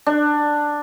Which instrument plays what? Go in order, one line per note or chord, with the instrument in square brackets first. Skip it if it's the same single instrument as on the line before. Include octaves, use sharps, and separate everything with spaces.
[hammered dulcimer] D4